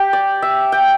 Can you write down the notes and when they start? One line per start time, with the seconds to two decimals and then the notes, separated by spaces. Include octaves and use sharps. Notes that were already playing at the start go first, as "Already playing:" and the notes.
Already playing: G4
0.13 D5
0.42 E5
0.72 G5